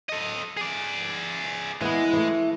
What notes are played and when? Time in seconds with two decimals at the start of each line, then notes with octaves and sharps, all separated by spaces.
0.09 A4 D#5
0.57 G#4 D5
1.81 E3 G#3 B3
2.13 E3 A3